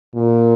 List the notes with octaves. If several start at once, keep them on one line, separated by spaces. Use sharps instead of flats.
A#2